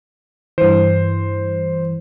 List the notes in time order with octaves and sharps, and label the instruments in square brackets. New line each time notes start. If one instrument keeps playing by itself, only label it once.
[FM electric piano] G2 E3 [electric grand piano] C5